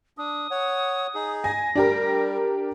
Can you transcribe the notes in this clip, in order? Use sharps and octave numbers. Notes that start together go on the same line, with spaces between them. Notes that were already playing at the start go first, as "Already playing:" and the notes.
D4 D#6
C#5 F#5
D#4 G#4
G#5 A#6
G3 D4 G4 A#4